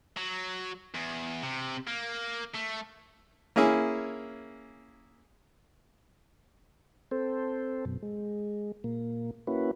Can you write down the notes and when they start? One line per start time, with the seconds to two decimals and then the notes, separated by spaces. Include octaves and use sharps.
0.17 F#3
0.94 E2
1.43 C3
1.87 A#3
2.55 A3
3.56 A#3 C#4 E4 G#4
7.11 C4 A4 C5
7.85 F#2 B2
8.02 G#3
8.84 A#2 A#3
9.47 A#3 C#4 E4 F#4 B4